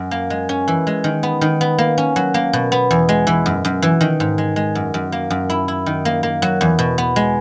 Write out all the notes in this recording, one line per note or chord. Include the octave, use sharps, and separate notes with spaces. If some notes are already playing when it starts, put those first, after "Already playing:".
Already playing: F#2
A#3
G#3
C#4
E3
G#3
D#3
B3
D#3
B3
A#3
C#4
F#3
A#3
B2
B3
E2
G#3
E3
F#2
F#2
E3
D#3
G#2
G#3
G#3
F#2
F#2
A#3
F#2
E4
E4
D#3
A#3
A#3
F#3
E2
B2
B3
G#3